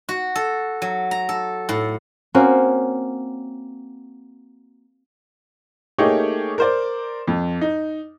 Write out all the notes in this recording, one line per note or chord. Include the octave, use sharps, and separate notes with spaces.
F#4
A4
F#3
A#5
A4
A2
A#3 C4 C#4 F#4
A3 A#3 D#4 G4 G#4 C#5
A#4 C5 D5
F2
D#4